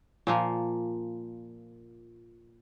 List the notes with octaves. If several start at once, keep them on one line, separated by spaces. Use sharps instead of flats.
A#2 F3 A#3